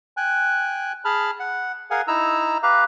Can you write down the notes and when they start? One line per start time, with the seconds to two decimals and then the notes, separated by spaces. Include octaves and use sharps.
0.17 G5 G#5 F#6
1.05 G#4 A5 B5 F6
1.40 F#5
1.91 G#4 A#4 F5 F#5 G#5
2.08 D#4 E4 A#5 E6
2.63 G4 B4 F5 A#5